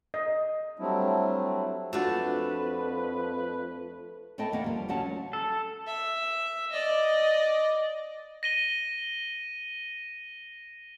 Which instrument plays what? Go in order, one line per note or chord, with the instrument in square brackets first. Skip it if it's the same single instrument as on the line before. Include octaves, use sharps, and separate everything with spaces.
[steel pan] D#5
[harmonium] F#3 G3 A3 C4 D4 E4
[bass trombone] F2 [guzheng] A3 D4 [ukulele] F4 F#4 [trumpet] B4
[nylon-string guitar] A3 E4 A4 D#5 G5 A5
E2 A#3 C#4 F#5
F3 G3
D2 F#3 G3 C#4 F#5 A5
[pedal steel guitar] A4
[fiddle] E5
D5 D#5
[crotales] A#6 D#7 G7